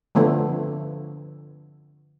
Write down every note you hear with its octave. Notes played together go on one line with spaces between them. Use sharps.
D3 F3 A3 B3 D4